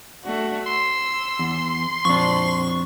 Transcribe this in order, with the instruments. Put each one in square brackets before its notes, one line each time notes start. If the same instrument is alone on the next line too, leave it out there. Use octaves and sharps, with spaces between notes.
[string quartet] A3 D4 F#4
[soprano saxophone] C6 [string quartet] E6
[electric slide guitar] E2
[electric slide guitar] F2 D4 [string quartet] A#2 C4 [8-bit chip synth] C#6